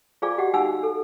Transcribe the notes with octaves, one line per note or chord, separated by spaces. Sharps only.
F4 G#4 D5 F5 G#5 D6
F#4 G4 D#5 F#5
D#4 F5 F#5 G#5 E6
A4